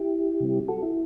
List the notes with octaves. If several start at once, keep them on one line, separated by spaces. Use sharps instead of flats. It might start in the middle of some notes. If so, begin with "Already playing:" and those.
Already playing: E4 G4
C3 G3 C4
F#4 A4
E4